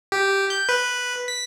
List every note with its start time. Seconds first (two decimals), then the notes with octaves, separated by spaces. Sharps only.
0.12 G4
0.50 G6
0.69 B4
1.28 B6